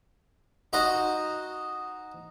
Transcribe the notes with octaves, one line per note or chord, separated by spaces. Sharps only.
D#4 F#4 C5 D#5